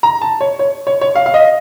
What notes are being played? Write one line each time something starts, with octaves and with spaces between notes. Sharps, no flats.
A#5
A5
C#5
C#5
C#5
C#5
F5
F5
D#5